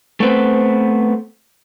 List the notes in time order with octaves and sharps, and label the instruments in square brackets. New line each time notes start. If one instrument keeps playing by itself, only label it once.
[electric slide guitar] A3 B3 C4 B4 C5